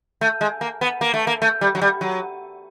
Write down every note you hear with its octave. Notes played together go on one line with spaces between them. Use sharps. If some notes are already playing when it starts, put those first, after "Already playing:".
A3
G#3
A#3
B3
A#3
A3
A#3
A3
G3
F#3
G3
F#3